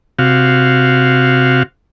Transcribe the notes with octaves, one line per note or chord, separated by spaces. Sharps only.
C3 F#4 F5